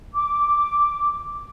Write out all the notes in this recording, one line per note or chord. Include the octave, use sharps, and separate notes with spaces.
D6